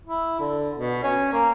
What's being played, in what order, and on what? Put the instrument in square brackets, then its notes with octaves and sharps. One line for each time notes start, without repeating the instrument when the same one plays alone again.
[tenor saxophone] E4
D3
B2
C#4
A#3